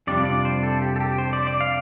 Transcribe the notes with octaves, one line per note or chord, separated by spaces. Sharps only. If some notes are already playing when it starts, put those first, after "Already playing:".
F2 C3 G3 D4 F4 D5
D5
C5
A4
G4
A4
G4
C5
D5
D5
F5